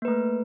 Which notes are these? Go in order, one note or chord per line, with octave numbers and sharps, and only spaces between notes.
A3 A#3 B4